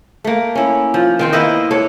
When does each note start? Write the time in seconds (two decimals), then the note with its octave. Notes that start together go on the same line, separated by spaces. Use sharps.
0.24 A3 A#3
0.55 C#4 E4
0.94 F3
1.19 D#3 C4 C5
1.33 A#3 B3 E4 D#5
1.71 D4 A4 C#5